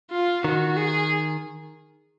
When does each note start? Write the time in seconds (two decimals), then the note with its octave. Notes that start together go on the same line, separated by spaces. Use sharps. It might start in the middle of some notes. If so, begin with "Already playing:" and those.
0.11 F4
0.44 D#3 F#4
0.76 G#4